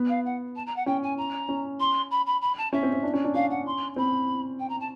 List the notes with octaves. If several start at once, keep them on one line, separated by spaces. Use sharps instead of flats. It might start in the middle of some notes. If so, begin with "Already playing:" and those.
Already playing: B3
F5
F#5
A5
A#5
F#5
C#4 G5
G#5
A#5
C#4
C6
B5
B5
B5
A5
C#4 E5
C4
C4
D4
C#4
D4
C#4 F5
F#5
C6
C4 B5
G5
A#5
A5